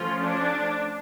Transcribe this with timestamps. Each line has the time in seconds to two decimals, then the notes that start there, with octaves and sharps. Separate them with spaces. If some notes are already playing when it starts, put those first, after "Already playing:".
Already playing: F3 A3 C#4 F4
0.23 D4